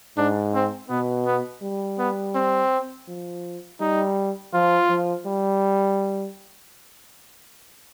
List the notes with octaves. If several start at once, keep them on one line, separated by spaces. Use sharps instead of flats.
G#2 D4
C4
B2 B3
B3
G3
B3
C4
F3
G3 D#4
F3 F4
F3
G3